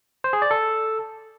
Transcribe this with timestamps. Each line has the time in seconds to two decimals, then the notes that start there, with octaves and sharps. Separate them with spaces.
0.24 C5
0.33 G#4
0.42 D5
0.51 A4